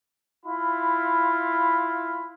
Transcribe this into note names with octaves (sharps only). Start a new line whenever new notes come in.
E4 F4 B5